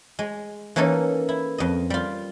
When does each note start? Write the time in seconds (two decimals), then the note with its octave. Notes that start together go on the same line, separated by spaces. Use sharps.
0.19 G#3
0.76 E3 A#3 C#4 D#4 A4
1.29 E4
1.58 F2 D#5
1.90 G3 F4